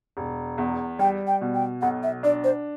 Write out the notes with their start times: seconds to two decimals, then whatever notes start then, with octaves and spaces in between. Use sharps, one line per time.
0.17 E1
0.58 E2
0.99 G3 G5
1.27 G5
1.41 B2
1.55 G5
1.82 B1 F#5
2.03 E5
2.23 D4 D5
2.44 C5